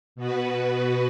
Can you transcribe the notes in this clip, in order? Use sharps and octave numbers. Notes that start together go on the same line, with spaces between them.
B2 B3 F#4 B4